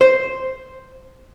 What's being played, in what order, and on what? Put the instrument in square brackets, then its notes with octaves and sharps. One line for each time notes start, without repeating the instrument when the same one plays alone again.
[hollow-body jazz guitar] C5